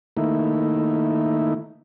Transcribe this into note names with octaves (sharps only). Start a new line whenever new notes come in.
D#3 A3 A#3 D#4 E4